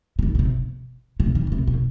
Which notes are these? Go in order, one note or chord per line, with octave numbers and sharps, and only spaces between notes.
C3
D#3
B2
C3
C3
D#3
D#3
C3
B2